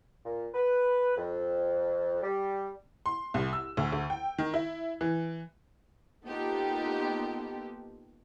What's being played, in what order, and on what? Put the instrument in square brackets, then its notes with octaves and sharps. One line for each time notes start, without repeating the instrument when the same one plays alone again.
[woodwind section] A#2
B4
F2
G3
[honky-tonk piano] C6
C2
E6
D2
D2
G5
D#3
E4
E3
[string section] A#3 B3 D#4 F4 G4 A4